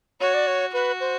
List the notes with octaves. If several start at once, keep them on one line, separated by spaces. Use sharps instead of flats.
F#4 C#5
D5
C#5
F#4 B4
C5